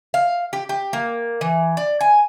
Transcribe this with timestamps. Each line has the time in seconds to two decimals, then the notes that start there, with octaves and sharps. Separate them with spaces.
0.14 F5
0.53 G4
0.69 G4
0.93 A#3
1.41 E3
1.77 D5
2.01 G#5